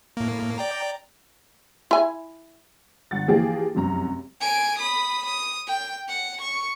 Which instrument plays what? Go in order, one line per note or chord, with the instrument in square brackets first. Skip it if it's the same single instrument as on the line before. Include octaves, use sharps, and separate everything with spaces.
[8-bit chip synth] A2 A#3
D5 G5 A#5
[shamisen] E4 G#5
[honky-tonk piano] G1 F#5 A6
E3 F3 A#3 G4 G#4
F1 C2 F#2 A#5
[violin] G#5 D7
B5 D#6
D#6
G5
F#5
C#6